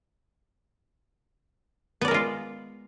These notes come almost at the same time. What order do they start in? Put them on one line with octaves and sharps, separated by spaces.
B3 D5 A#4 G#3 F4